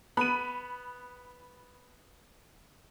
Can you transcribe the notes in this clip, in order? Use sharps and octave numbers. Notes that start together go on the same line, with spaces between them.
B3 B5 D#7